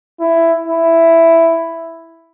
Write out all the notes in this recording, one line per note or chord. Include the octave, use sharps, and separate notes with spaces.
E4
E4